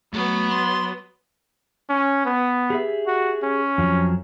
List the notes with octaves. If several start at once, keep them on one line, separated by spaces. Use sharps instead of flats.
F#3 A3 B3
C6
C#4
B3
G4 G#4 E5
F#4
C#4
F2 F3 F#3